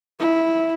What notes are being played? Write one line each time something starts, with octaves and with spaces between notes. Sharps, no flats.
E4